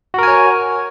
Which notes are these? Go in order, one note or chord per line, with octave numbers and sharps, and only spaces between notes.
F#4 A#4 C#5 G#5